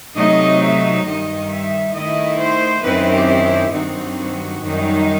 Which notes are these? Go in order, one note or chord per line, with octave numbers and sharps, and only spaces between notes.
C3 F#3 A3 D#4 D#5
E5
G2 D#3 G3 D#4 D#5
E5
D#3 A3 E4 D#5
C5
F#2 D#3 F#3 C4 E4 B4
G4
G4
G2 D#3 F#3 C4 D#4 F#4
F#2 D#3 G3 D#4